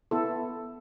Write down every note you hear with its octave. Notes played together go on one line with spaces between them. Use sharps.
B3 E4 A4